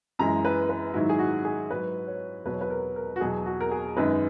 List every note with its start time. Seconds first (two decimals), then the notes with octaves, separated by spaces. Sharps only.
0.19 F#2 E3 G#3 A#5
0.45 B4
0.69 B4
0.94 G#2 D#3 F#3 E4
1.09 G#4
1.19 F#4
1.45 G#4
1.71 G#2 F#3 B4
2.08 C#5
2.45 E2 B2 F#3 B4
2.53 C#5
2.61 B4
2.70 A#4
2.96 A#4
3.16 F#4
3.21 E2 B2 F#3 G#4
3.46 F#4
3.61 A#4
3.71 G#4
3.97 F#2 D#3 G#3 B4